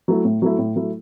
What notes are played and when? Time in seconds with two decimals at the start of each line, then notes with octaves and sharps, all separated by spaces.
0.08 F#3 A3 E4
0.25 A2
0.42 F#3 A3 E4
0.58 A2
0.76 F#3 A3 E4